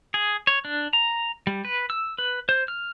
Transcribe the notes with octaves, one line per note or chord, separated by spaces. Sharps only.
G#4
C#5
D4
A#5
G3
B4
E6
B4
C5
F6